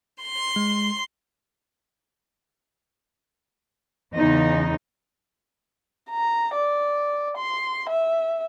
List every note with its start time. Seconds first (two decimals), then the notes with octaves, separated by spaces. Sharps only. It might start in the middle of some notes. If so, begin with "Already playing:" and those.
0.22 C6
0.56 G#3
4.13 E2 C#3 D#4
6.10 A#5
6.54 D5
7.37 C6
7.89 E5